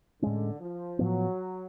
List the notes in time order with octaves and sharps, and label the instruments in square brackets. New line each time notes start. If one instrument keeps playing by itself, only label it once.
[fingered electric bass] A2 G#3 C#4 [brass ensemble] D3
[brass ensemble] F3
[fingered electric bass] A2 F3 B3 [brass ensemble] F#3